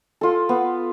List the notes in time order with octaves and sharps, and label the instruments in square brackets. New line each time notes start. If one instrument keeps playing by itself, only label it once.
[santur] F4 A4
B3